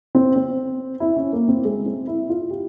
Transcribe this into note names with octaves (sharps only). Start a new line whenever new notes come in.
C4
C4
E4
C#4
A#3
C4
G#3
C4
E4
F4
G4